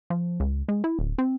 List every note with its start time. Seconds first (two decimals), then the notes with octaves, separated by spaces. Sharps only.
0.10 F3
0.40 C#2
0.69 G#3
0.84 E4
0.99 D1
1.18 C4